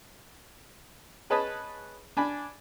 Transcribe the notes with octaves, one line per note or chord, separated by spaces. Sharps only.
G#4 B4 C#5 D#5 A5 B5
D4 G#5 B5